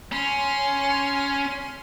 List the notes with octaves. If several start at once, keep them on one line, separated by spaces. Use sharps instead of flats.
C#4 C6